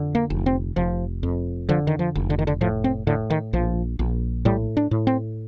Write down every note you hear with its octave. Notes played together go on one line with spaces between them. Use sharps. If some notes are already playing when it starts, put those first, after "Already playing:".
Already playing: F2 D3
A#3
F1
C4
F1 F3
F2
D3 F3
D#3
F3
F1
D3
D#3
D3
A2 F3
C4
A2 D3
D#3
A#1 F3
A#1
A2 G3
D4
A2
C4